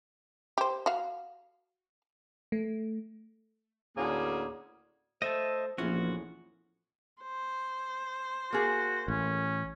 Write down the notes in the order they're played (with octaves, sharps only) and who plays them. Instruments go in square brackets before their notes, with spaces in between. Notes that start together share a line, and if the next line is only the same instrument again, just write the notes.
[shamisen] G4 C5
F#4 F5
[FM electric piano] A3
[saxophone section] D2 A2 D3 A#3 C#4 G#4
[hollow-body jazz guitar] A3 [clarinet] C5 [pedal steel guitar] D#5 E5 A5
[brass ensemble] A#1 [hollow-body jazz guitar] E2 A2 C#4 [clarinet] F4 [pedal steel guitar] F#4
[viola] C5
[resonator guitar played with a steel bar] A#3 G#4 [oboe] F#4
[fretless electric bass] A1 [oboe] C#4